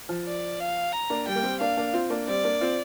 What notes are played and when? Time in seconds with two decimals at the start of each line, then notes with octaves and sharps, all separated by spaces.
0.09 F3
0.27 D5
0.60 F5
0.92 A#5
1.10 A#3 D4
1.27 G3 G5
1.35 A#3
1.43 G3 C4
1.60 A#3 D4 F5
1.77 A#3 D4
1.93 C4 F4
2.10 A#3 D4
2.27 G3 C4 D5
2.44 A#3 D4
2.61 C4 F4